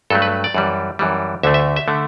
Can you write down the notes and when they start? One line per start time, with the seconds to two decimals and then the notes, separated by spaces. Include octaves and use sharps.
0.10 G2 F#3 A3 A4
0.22 B4
0.44 D5
0.55 F#2 E3 G3
0.99 F#2 E3 G3
1.43 D2 D3 A3 E5
1.54 E5
1.76 E5
1.88 D3 A3